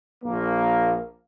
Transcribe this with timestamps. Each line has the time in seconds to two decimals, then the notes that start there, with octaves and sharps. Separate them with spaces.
0.23 A#1 A#3